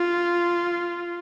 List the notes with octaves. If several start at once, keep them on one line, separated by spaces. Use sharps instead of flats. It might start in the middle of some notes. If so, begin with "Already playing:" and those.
Already playing: F4